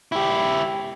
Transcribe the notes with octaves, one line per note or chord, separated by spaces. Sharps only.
E4 G4